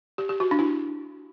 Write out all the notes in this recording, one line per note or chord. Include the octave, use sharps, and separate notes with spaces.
G4
G4
F#4
D4
E4